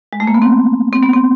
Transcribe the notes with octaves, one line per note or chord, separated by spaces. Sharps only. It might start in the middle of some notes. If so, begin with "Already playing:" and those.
G#3
A3
A#3
B3
C4
C4
B3
C4